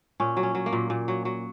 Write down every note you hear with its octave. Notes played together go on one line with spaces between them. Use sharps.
A#2 C#4
F#3
C#4
F#3
A#3
A#2
A#2
F#3
F#3